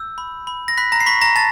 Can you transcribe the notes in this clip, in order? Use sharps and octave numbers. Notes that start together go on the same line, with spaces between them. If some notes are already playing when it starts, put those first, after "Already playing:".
Already playing: E6 G6
B5
B5
A#6
B5 F#6 B6
A#5 A#6
C7
B5 C#6 B6
A#5 A#6
A5 A6